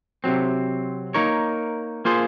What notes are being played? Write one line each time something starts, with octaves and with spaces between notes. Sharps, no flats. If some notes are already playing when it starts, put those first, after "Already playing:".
C3 F#3 C4
A#3 D#4 A#4 C#5
A#3 F4 G#4 C5